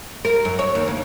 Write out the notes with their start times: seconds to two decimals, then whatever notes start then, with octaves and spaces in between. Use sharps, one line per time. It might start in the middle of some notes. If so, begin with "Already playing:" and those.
0.25 A#4
0.45 F#2
0.59 C#5
0.75 D#2
0.88 D2